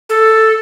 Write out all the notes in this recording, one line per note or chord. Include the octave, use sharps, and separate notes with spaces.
A4